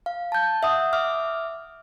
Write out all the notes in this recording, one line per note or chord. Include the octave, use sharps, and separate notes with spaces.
F5
A5 G6
E5 F#5 D#6
E5 D6 F6